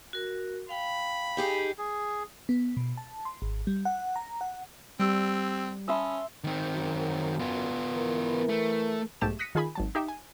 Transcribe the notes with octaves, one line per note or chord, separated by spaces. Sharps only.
F#4 A#4
F5 G5 B5
D#4 G4 G#4
G#4
B3
B2
A5
C6
G#1
G3
F#5
A#5
F#5
G3 C4 G4 E6 D7
C#4 E5 A5 B5 C6 D#6
D#3 C4
F#2
B3 F4
E3 A#4
A3
B1 G#2 A3 G4 A5 E7
D#6 F#6 A#6 B6 C#7 D#7
D#3 F4 G#4 G#5 B5 D#6
G#1 F#3 A5
D#4 G4 E5 G5
G#5